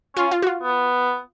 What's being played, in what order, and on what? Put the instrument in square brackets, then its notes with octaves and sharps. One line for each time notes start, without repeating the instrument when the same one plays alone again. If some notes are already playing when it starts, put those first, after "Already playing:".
[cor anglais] C#4 [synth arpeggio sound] F4
[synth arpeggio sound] F4
F#4
F4
[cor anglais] B3